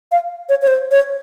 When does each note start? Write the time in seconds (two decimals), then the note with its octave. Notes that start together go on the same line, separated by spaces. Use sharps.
0.12 F5
0.49 C#5
0.62 C#5
0.67 C5
0.91 C#5